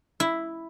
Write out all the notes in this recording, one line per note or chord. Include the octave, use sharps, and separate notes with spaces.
E4